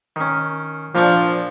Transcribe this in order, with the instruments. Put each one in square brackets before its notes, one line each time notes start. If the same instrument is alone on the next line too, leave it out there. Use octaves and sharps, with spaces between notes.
[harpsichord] D#3 C#4
[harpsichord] A#2 D4 C#6 [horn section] F3